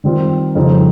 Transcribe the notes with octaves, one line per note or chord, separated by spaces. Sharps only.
D#3 G3 C4 F4
F2 C#3 G3 C4 D#4